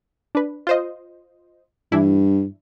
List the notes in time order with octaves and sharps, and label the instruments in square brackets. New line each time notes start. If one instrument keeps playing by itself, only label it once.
[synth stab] D4 B4
F4 C5 D#5
[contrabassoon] G2 [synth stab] E3 D4 E4